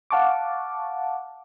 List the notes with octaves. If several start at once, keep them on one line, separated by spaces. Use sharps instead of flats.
F5 F#5 A5 C#6 D6